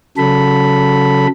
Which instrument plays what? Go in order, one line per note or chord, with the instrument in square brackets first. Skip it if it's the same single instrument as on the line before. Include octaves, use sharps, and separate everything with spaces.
[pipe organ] C#3 F#3 A4 B5